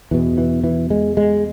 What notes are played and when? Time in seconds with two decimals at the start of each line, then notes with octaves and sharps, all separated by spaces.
0.11 E2 B2 E3
0.38 E3
0.64 E3
0.90 G#3
1.17 G#3